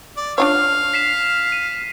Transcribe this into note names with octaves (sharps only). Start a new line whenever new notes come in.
D5
D4 F4 C#5 F5
B6 C7 E7
D#7